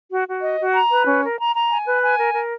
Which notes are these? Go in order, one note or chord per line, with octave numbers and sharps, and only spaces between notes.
F#4
F#4
D#5
F#4
A#5
B4
C#4
A#4
A#5
A#5
G#5
B4
G#5
A#4
A#4